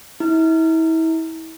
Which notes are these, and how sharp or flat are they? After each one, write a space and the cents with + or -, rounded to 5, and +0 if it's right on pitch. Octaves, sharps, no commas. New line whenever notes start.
E4 -35